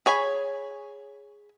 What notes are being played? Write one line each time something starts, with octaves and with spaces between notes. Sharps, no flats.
G#4 C#5 G#5 B5